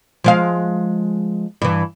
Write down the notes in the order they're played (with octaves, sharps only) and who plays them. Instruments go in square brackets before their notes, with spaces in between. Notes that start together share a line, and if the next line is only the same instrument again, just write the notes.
[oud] F3 G#3 F5
G2 E3